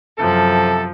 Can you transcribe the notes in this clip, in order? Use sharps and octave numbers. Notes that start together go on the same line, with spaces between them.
F#2 C3 F3 A4